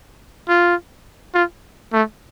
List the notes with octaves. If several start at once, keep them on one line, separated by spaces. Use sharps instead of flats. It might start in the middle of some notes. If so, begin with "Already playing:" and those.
F4
F4
A3